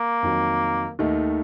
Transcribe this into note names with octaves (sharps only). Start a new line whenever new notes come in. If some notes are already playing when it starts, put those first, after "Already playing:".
Already playing: A#3
F2 D#3 F#3
D#2 D#3 A3 D#4